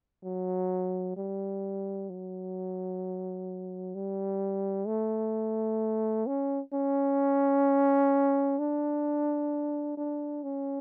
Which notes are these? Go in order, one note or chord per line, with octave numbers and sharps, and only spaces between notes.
F#3
G3
F#3
G3
A3
C#4
C#4
D4
D4
C#4